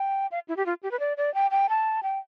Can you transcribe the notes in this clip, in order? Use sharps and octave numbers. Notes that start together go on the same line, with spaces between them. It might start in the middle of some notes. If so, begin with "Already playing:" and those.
Already playing: G5
F5
E4
G4
F4
G4
B4
D5
D5
G5
G5
A5
G5